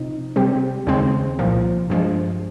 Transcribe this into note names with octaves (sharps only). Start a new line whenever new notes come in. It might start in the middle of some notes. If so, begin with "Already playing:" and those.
Already playing: C3 F3 D#4
C3 G3 C4 G4
D#2 C#3 G#3 C4
C2 A#2 F3
G2 F3 G#3